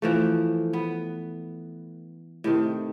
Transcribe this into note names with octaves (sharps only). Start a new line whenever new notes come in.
E3 F3 A3
B3
A2 C3 D#3